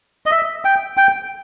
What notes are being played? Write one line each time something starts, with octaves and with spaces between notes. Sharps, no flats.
D#5
E5
G5
G5